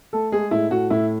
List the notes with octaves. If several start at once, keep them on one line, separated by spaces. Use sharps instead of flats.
A3 A4
G#3 G#4
A2 E4
A2 F#4
A2 E4